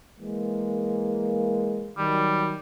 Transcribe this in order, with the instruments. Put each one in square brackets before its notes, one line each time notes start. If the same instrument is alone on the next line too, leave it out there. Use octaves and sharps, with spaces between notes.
[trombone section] E3 G#3 A#3
[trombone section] D#3 F#3 [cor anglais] G3